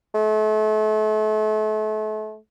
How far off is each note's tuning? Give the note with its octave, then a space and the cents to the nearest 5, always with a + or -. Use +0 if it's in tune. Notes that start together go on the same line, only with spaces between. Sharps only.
A3 -35